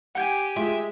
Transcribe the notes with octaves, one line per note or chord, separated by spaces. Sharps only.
G4 F#5 G#5 G6 G#6
G#3 F4 E5